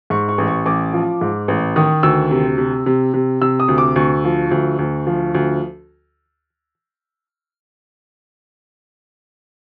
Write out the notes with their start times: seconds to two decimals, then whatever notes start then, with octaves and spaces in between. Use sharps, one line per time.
0.10 G#2 C#6
0.29 C#6
0.38 A1
0.47 C#6
0.66 A1 D6
0.93 F3
1.21 G#2
1.48 A1
1.76 D#3 D#6
2.03 D2 E6
2.31 C3
2.58 C3
2.86 C3
3.14 C3
3.41 C3 E6
3.60 D#6
3.68 D2
3.78 D6
3.96 D2 C#6
4.24 F3
4.51 D2
4.79 D2
5.07 F3
5.35 D2